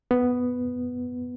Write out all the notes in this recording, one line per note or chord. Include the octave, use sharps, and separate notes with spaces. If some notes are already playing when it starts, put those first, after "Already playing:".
B3